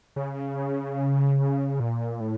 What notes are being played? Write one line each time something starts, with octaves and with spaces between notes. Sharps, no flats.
C#3
A#2
A2